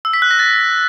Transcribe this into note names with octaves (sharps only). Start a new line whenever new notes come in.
E6
B6
F#6
A#6
A6